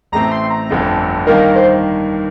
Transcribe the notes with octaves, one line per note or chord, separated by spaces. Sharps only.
A1 A2 A3 C4 A#5
C6
A#5
G1 F2 D3 A3 C4
G2 D#3 A#3 D#4 A#4
C5